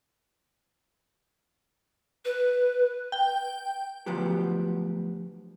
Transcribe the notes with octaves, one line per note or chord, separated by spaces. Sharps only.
B4
G5
D2 F3 F#3 B3 G4